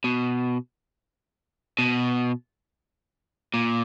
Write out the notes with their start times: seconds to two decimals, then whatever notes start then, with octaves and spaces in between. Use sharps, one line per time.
0.04 B2
1.79 B2
3.54 A#2